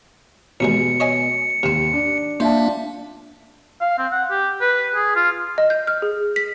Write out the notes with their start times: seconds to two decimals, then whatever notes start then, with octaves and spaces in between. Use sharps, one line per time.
0.60 A1 D#2 B2 G#3 C#7
1.00 C#5 D#5 G#5
1.63 D#2 C3 C4
1.93 D4
2.40 A#3 D4 F4 C5 D5 E5 A5
3.81 F5
3.98 C4
4.12 F#5
4.31 G4
4.61 B4
4.95 G#4
5.15 F4
5.58 D#5
5.70 G6
5.87 F6
6.02 G#4
6.36 B6